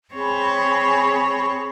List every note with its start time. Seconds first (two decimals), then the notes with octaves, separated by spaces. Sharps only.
0.14 C4 G#4 C#5 B5